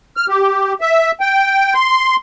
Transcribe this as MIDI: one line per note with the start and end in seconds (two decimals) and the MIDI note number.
0.17 0.26 89
0.29 0.73 67
0.81 1.11 76
1.21 1.74 79
1.75 2.16 84